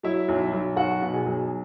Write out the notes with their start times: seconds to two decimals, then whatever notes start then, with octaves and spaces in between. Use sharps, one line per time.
0.03 F#3 E4 E5
0.29 B1
0.53 B1
0.76 B1 F#4 F#5
1.02 B2
1.13 G#4 G#5
1.26 B1